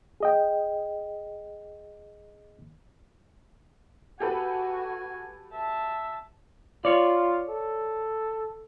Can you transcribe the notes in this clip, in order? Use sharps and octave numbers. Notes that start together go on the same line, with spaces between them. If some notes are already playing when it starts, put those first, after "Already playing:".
G#4 D#5 G5
F#4 G4 A4 B4 G#5
E5 A5
F4 C#5 D5
A4